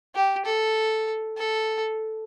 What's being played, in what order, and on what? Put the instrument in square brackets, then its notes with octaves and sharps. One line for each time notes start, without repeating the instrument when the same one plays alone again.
[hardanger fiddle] G4
A4
A4